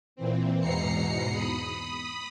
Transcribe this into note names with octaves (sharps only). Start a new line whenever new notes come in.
A#2 E3 C4
E2 G#2 B2 A#5 C7 C#7
B5 D#6